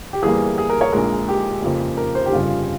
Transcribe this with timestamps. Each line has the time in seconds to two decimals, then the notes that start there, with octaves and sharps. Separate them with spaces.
0.13 G4
0.22 E2 E3 G3 A#3 G#4
0.58 G#4
0.70 A#4
0.81 C#5
0.92 A#1 A#2 G#3 A#4
1.28 G4
1.62 F2 C#3 F3 A#3
1.97 A#4
2.15 C5
2.26 G4
2.32 G1 F2 C#3 G3 F4